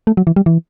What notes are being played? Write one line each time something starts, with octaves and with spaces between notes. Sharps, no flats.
A3
F#3
E3
G3
E3